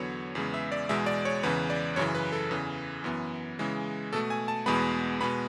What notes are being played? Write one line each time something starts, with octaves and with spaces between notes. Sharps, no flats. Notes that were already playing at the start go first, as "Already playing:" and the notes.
Already playing: E2 D3 F#3 B3 C#5
E2 C#3 G#3 B3
E5
D5
E2 B2 G#3 E5
D5
C#5
E2 C#3 E3 B4
D5
F#2 C#3 E3 C#5
B4
A4
E2 C#3 E3
F#2 E3 B3
C#3 E3 G#3
B2 A3 A4
G#5
A5
E2 B2 G#3 B3 B5
B2 G#3 B3 B5